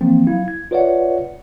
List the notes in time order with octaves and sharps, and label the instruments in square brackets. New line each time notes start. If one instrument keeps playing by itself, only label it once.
[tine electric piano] E3 F3 A#3 C4
F#3 E4 F5 G#6
G#6
F4 B4 C#5 D5 E5 F#5